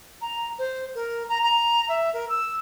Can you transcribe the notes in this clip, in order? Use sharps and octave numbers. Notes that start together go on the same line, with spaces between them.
A#5
C5
A#4
A#5
A#5
E5
A#4
E6